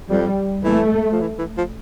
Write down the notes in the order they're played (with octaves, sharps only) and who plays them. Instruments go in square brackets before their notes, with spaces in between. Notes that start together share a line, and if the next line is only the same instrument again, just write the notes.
[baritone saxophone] F2 [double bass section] G3
[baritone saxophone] E3 [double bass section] A3
[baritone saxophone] F3
E3
E3
F3